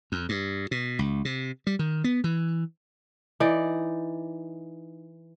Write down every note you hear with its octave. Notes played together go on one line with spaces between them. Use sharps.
F2
G2
B2
C#2
C3
G3
D#3
B3
E3
E3 D#4 D5